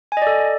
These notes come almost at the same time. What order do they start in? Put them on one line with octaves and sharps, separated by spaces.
G#5 D#5 D5 A4